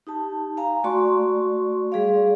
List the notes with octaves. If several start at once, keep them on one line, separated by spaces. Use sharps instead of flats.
D#4 G4 A5
F5 G#5 A#5
A3 F#4 D5 C6 C#6
G3 G#4 D5 F5